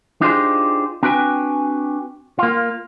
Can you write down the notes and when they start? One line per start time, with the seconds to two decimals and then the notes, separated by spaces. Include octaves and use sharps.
0.21 D4 D#4 F4 G4 G#4 C5
1.03 C4 D4 F#4 B4 G5 G#5
2.39 A#3 F4